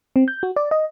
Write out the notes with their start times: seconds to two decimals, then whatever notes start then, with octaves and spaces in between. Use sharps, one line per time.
0.16 C4
0.28 G6
0.43 F#4
0.56 D5
0.71 D#5